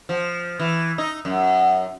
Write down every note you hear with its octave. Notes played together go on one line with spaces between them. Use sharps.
F3
E3
D#4
F#2